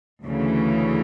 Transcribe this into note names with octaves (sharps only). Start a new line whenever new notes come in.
D2 C#3 E3